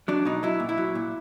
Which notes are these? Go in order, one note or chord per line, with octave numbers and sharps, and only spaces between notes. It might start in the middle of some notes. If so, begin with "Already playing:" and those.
F#3 D4
B2 D#4
F#3 E4
A#2
E4
F#3
A#2